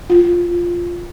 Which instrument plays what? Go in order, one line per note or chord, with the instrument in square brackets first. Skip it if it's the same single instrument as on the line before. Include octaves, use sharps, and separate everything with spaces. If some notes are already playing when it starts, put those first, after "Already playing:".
[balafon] F4